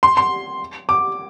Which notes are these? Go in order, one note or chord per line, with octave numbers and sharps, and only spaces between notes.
C6
C6
D6